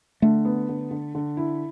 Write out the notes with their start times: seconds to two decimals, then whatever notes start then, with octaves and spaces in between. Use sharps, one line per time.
0.22 D3 A3
0.45 B3
0.69 D3
0.91 D3
1.15 D3
1.37 E4